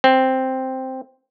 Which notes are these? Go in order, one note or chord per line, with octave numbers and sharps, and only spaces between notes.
C4